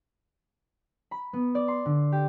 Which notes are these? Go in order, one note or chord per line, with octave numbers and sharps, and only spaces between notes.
B5
B3
D5
C6
D3
G4